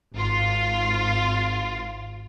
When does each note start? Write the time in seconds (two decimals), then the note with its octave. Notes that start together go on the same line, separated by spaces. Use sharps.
0.16 G#1 F4